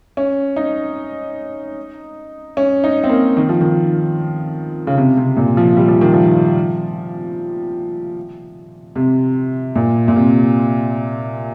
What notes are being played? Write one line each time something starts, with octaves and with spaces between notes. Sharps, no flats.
C#4
D#4
C#4
D#4
C4
A#3
D#3
F3
D#3
C#3
C3
C3
A#2
F3
G3
F3
D#3
F3
C3
A#2
A#2
C3